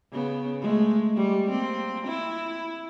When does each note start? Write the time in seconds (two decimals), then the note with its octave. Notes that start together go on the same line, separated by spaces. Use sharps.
0.12 C#3 B3
0.61 G#3 A3
1.16 G3
1.50 A#3 C4
2.07 E4